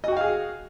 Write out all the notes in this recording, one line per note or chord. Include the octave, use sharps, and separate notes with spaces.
F#4 G#4 D#5 F5 G5